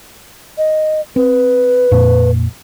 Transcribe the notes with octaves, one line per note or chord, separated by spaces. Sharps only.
D#5
C4 B4
F2 A#2 A#3